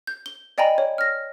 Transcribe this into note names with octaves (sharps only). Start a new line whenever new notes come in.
G6
G7
D5 D#5 G5 G#5 A#5 B5
C#5
F6 A#6